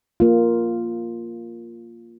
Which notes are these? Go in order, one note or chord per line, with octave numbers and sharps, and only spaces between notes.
A#3 F4